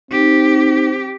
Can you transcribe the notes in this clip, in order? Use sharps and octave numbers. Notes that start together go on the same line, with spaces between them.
C4 D#4 G4